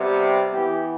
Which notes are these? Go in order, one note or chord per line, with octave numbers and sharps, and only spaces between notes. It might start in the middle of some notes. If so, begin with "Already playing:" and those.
Already playing: C3 G3 B3
E3 B3 G4